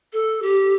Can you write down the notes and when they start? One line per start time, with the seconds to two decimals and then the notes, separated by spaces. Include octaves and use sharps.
0.13 A4
0.42 G4